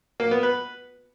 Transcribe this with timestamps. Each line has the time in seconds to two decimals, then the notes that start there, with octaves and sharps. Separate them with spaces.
0.20 A#3
0.31 B3
0.43 B4